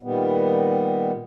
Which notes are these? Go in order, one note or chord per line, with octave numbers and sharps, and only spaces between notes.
A#2 D#3 G3 B3